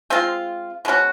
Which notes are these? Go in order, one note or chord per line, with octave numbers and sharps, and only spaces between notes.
G#3 C4 F4
B2 G#3 C#4 F#4